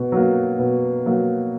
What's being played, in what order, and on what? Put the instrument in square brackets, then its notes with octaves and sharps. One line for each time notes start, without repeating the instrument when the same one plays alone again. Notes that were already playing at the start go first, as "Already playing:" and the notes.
Already playing: [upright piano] B2
F#3 A#3
B2
F#3 A#3